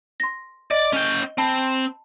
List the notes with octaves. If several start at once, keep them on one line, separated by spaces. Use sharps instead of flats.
C6 A#6
D5 D#5
C#4 G5
C4 A5 B5